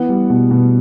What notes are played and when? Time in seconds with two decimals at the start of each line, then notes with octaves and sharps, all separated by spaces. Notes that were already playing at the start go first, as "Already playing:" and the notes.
Already playing: E3 B3 F#5
0.09 G3
0.30 B2
0.51 B2